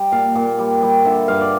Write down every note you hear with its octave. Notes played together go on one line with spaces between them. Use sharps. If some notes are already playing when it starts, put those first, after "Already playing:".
Already playing: G3
A#2 F5
A#2
G3
G3
D3 E5
G2 F5
D5